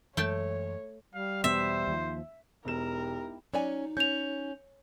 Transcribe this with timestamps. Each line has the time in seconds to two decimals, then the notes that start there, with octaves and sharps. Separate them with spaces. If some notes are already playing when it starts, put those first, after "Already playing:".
0.17 F#2 E3 G#3 A3 C#5 G5 A5
1.14 G3 F5
1.44 E2 B2 B3 C5 E5
1.88 D#2 F3
2.65 E1 D#4 E4 G4 A#4 E7
3.54 F#3 C#4 D#4 D5 G#5
3.97 C#4 G6 F7